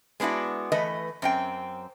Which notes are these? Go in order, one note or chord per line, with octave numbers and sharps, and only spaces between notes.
G#3 B3 D4 E4 F#4
E3 A3 B4 D#5
F#2 C4 G5